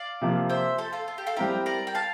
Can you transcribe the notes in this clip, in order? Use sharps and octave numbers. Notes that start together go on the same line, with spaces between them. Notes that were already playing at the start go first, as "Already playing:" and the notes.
Already playing: D5 F5
C3 F3 A#3 F4
C5 E5
A4 C5
F4 A4
F4
G4
F4 A4
G3 C4 E4 G4 A#4
A#4 D5
G5
F5 A5